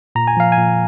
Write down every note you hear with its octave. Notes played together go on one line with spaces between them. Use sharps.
A#2 A#5
G#5
F3 F5
G#5
A#2